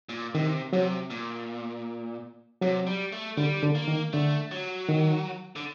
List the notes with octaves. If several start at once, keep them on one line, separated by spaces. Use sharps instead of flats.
A#2
C3 D#3
C3 F#3
A#2
C3 F#3
G3
A3
D3 G3
D3
A#3
D#3
D3 A3
F#3
D#3
D3